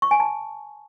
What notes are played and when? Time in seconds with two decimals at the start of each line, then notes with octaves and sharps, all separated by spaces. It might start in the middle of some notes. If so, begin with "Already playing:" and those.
0.02 C#6
0.11 G#5
0.20 A5